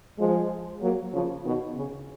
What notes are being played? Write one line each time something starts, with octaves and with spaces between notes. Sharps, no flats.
F3 G#3
F#3 A#3
C#3 F3
B2 D#3
C#3